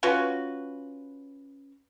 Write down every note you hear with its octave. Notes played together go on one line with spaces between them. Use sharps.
C#4 F4 F#4 B4